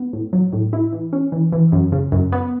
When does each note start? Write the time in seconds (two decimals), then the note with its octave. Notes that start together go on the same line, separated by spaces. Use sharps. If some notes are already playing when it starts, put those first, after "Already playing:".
Already playing: B3
0.13 A2
0.33 F#3
0.53 A2
0.73 E4
0.93 E3
1.13 C#4
1.32 E3
1.53 E3
1.72 F#2
1.92 C#3
2.12 F#2
2.32 B3